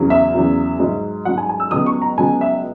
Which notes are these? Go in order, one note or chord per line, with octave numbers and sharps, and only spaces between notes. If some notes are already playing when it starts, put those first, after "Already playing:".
Already playing: E2 C#3 F#3
E5
E2 C#3 F#3
G#2 F#3
G#2 F#3 F#5
G#5
G#5
E6
C#2 B2 F#3 D#6
C#6
A#5
C#2 B2 F#3 G#5
E5